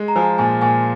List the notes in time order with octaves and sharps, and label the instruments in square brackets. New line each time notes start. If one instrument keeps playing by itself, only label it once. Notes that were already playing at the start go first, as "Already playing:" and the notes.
Already playing: [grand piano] G#3
[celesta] A#5
[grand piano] F3 [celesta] G#5
[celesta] A#5
[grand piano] A#2 [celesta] G#5
[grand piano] A#2 [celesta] G#5